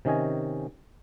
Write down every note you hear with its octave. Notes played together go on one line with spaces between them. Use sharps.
C3 D#3 C#4 D#5 G#5